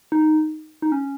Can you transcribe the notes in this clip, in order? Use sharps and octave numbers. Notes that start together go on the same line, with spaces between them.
D#4
D#4
C#4